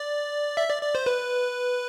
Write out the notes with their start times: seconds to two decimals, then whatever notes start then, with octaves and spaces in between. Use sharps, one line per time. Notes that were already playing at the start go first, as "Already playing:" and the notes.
Already playing: D5
0.57 E5
0.70 D5
0.82 D5
0.95 C5
1.06 B4